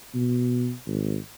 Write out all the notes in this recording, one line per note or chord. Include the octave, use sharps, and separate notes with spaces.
B2
G#1